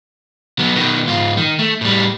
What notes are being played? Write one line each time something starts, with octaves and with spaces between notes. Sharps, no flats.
F#3 B3
B2 D#3
G#2 F4
D#3
A3
A2 G3